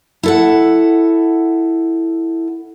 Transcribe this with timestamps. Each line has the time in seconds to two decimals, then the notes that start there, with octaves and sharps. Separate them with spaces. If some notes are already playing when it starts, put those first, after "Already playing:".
0.23 E4 A4 F#5